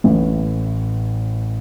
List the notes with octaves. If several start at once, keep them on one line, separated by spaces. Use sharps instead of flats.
A1 A2 E3